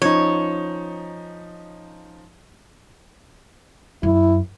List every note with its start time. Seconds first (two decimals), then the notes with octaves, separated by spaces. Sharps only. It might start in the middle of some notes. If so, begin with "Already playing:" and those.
0.02 F3 C#4 D#4 C#5
4.03 F#2 E4